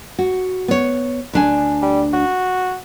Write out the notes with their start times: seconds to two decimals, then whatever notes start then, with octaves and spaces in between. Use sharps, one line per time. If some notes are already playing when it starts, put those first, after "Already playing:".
0.19 F#4
0.68 B3 C#5
1.33 D2 D4 G#5
1.82 G3
2.13 F#4